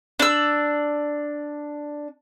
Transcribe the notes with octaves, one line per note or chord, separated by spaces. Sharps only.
D4 E6